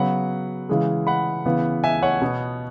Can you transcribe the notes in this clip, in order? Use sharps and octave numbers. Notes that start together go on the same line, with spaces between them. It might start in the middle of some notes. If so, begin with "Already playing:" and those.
Already playing: C#3 F#3 B3 F#5 B5
C#3 E3 G#3
F#5 B5
C#3 E3 B3
E5 G#5
C#5 F#5
B2 B3